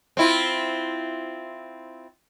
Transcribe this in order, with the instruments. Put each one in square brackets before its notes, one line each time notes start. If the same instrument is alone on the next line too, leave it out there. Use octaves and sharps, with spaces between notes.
[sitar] C4 E4 F4